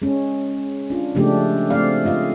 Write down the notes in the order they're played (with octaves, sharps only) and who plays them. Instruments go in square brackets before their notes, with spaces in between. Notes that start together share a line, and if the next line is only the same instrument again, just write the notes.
[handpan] G#3 C#4
D4 F4
C#3 F3 G#3 A3 D4 G4
A3 C4 D5 F5
G#3 F4 D#5 F5